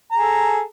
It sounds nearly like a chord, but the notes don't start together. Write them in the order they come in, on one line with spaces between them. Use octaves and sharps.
A#5 G#4 A4